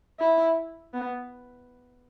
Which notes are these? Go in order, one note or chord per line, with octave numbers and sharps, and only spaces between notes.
E4
B3